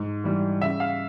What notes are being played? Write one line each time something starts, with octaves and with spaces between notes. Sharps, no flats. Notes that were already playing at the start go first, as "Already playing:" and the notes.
Already playing: G#2
E3 G3
C#3 E5
F5